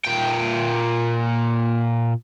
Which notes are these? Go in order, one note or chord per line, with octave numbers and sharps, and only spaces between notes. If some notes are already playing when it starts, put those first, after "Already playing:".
A#2 G5